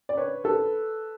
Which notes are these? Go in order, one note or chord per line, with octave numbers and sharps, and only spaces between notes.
D5
B4 C#5
A4 B4